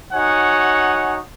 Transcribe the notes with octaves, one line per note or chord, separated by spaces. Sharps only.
D#4 F#4 C#5 F#5 G#5